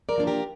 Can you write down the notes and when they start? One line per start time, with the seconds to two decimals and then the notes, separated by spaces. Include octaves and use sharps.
0.09 A#4 D5
0.17 F3 A#3 D4
0.27 G4 A#4